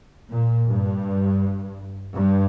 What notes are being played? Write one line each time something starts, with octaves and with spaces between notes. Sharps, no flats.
A#2
G2
G2